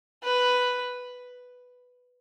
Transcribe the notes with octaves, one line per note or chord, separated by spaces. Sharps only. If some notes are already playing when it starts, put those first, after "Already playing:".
B4